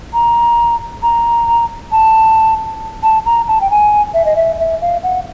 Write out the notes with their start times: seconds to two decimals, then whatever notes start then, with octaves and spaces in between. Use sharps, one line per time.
0.14 A#5
1.03 A#5
1.92 A5
3.03 A5
3.26 A#5
3.48 A5
3.61 G5
3.71 G#5
4.14 E5
4.25 D#5
4.36 E5
4.60 E5
4.82 F5
5.03 F#5